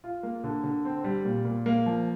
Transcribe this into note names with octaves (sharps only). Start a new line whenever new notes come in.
F4
A#3
D3
D3
C4
G3
A#2
A#2
A#3
F3